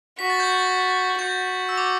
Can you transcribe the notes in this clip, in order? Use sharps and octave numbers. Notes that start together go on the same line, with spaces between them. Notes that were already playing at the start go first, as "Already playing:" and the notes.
F#4 B6
A6
G6
A6
F#4 G6
E6
D6